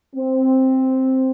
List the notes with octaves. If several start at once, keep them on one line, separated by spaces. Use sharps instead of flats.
C4